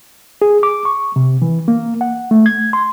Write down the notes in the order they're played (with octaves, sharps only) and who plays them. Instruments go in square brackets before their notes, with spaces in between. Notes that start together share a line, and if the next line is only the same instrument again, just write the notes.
[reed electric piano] G#4
D6
C#6
C3
E3
A#3
F#5
A3
G#6
C6